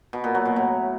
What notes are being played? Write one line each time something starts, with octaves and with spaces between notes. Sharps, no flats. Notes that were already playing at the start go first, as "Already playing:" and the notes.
B2
A#2
F#3
B2
A2